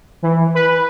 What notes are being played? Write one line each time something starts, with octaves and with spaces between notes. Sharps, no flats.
E3
B4